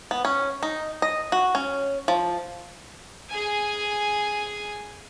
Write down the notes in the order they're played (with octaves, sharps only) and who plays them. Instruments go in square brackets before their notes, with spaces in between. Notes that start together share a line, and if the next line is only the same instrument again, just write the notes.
[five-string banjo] B3
C#4
D#4
D#5
F#4
C#4
F3
[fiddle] G#4 G#5